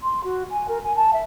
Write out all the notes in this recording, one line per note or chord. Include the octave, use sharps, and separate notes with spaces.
C6
F#4
G#5
A#4
G#5
A5
E5